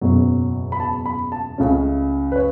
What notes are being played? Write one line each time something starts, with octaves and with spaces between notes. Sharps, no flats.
F#1 E2 B2 F#3
B5
A5
B5
A5
C#2 C#3 A3 C#4
B4
C#5